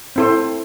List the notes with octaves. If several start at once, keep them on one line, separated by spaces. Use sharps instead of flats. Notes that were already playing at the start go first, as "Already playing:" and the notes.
C4 E4 A4 C5